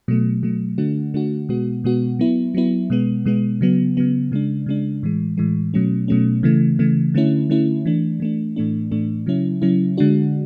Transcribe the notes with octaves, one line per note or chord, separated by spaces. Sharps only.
B2 F#3 A3
B2 F#3 A3
D3 A3 D4 F#4
D3 A3 D4 F#4
B2 G#3 B3 F#4
B2 G#3 B3 F#4
F#3 B3 E4
F#3 B3 E4
B2 G#3 B3
B2 G#3 B3
C#3 F#3 B3
C#3 F#3 B3
C#3 G#3 D4
C#3 G#3 D4
A2 E3 G#3
A2 E3 G#3
B2 F#3 A3 C#4
B2 F#3 A3 C#4
C#3 E3 A3
C#3 E3 A3
D3 A3 C#4 E4
D3 A3 C#4 E4
E3 A3 D4
E3 A3 D4
A2 E3 A3 D4
A2 E3 A3 D4
C#3 F#3 C#4 E4
C#3 F#3 C#4 E4
D3 G#3 D4 F#4